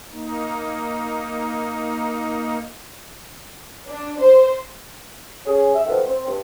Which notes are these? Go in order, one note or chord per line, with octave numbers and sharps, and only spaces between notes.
A#3 D#4
D4
C5
C#4 G#4
E5
B2 D#3 F3 A3 B3
C4
G2